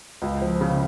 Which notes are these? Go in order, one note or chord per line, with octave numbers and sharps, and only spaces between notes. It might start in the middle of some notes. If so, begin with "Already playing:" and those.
C#2
F3
C#3